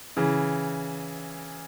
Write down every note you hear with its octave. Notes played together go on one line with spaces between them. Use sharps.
C#3 E3